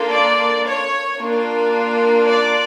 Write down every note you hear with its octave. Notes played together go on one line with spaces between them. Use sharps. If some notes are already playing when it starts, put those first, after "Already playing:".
Already playing: A#3 D4 F4 A4
D5
C#5
A#3 D4 F4
D5